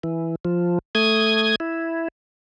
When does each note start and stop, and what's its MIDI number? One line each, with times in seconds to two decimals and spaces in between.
0.03 0.35 52
0.45 0.79 53
0.95 1.56 57
0.95 1.56 87
0.95 1.56 92
1.60 2.08 64